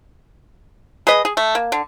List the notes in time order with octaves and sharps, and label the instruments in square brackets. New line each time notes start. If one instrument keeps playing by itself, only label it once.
[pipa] G#4 B4 D#5
G#4
A3
A#3
D3